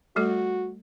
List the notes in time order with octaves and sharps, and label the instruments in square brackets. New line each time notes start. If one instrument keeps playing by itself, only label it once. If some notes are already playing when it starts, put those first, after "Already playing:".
[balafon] G3 A3 A4 [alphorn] F#4